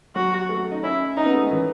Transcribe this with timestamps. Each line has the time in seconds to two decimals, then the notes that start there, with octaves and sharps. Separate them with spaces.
0.15 F#3 F#4
0.49 A3
0.71 D#4
0.83 C#4 E4
1.16 C#4 D#4
1.26 B3
1.34 A3
1.42 G#3
1.51 E3